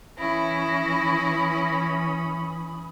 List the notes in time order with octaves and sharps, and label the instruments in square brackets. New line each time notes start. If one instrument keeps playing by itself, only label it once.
[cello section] E3 [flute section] C#4 B5 D#6 [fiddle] E4 [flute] A#6